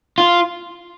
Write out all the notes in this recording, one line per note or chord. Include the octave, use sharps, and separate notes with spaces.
F4